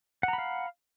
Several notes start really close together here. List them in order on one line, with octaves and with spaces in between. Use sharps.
F#5 A#5 B5 F5